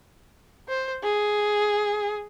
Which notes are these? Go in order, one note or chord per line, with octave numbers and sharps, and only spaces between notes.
C5
G#4